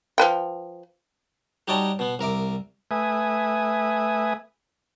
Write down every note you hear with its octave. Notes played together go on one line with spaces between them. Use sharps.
F3 B4 G5
G3 D#4 F#4 C#5 G5 A5
B2 B3
C2 A#4 E5 D6
A3 B4 E5 G#5 D#6